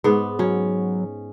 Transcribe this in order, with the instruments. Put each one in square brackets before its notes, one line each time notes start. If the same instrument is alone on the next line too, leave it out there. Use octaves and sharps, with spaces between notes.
[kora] G#2 B3
[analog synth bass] F#3 [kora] C#4